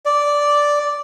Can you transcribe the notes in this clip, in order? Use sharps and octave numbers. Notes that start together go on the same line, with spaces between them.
D5